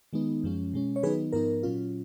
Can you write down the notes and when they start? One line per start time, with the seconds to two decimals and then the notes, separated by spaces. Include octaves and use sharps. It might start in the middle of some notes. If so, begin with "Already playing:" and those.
0.13 D#3 G#3 B3 D#4
0.44 F#2 F3 G#3 C#4
0.74 B2 G#3 C#4
0.96 C#5
1.03 D#3 F#3 B3 D#4 G#4 B4
1.33 G#2 F3 B3 D#4 A#4
1.63 A#2 F#3 C#4 F4